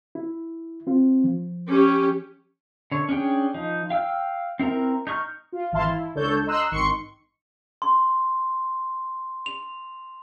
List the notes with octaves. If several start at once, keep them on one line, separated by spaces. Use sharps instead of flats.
E4
C4 F4
F3
C#4 G4
D3 C#5
C#4 D4 G#4 G5
F3 D#4
F5 G5 E6 F6
C4 E4 A#4 A#5
D#4 G#4 C#6 F6 G6
F4
G#1 E3 E4 F5 A5 C6
E4
C#2 D4 A4 C#5 A5 G6
D#5 A#5 C6 E6 F#6
G#1 D#3 C6 C#6 C#7
C6
F7